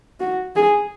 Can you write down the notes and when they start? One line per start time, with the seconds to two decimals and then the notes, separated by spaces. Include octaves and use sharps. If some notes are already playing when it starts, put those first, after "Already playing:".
0.20 F#4
0.56 G#4